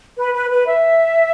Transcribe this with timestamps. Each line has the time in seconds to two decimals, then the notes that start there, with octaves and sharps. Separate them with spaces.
0.17 B4
0.34 B4
0.50 B4
0.68 E5